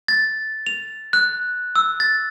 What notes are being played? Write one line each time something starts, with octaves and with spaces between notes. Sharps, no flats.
A6
F7
F#6
E6
A6